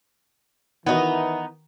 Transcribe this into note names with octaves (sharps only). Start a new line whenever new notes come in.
D#3 E3 B3 D#4 F#4